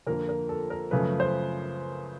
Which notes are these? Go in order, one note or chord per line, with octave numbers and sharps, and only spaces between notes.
F2 D3 F3 A#3 A#4
A#4
A4
A#4
F#2 C#3 F3 A3 B4
C5